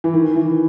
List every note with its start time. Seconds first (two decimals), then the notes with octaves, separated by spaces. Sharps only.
0.04 E3
0.14 D#3
0.35 E3